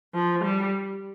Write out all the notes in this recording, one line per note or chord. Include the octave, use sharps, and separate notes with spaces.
F3
G3